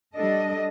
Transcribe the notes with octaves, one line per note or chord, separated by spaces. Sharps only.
G3 D4 A4 D#5